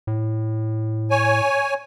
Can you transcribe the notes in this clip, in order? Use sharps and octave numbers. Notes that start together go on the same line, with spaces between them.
A2
C#5 G#5